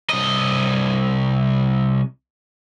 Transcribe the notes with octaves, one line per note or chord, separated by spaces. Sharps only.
C2 D#5